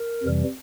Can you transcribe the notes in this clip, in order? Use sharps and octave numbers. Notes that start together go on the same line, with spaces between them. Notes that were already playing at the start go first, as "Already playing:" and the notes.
Already playing: A#4
F2 C3 E3 G3